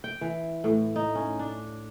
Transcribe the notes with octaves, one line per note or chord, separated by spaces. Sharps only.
G5
E3
A2
D#4
C#4
D4